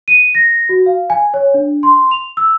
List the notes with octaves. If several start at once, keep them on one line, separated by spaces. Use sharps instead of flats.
D#7
A#6
F#4
F5
G#5
C#5
D4
C6
F7
E6